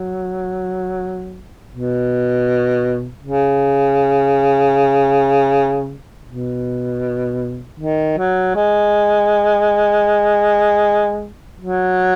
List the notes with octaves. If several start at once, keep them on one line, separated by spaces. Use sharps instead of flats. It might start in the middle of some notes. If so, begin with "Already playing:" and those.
Already playing: F#3
B2
C#3
B2
D#3
F#3
G#3
F#3